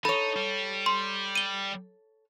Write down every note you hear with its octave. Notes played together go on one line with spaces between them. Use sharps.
D#4 A4 C#5 B5
G3
C6
D#7 G7